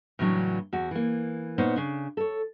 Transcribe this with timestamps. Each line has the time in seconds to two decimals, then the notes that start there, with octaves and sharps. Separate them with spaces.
0.19 A2 C#3 E3 F#3 D4
0.73 E2 F#4
0.91 E3 A#3
1.58 A#2 B3 D#4 C5 C#5
1.76 C#3 D4
2.17 A4 C#5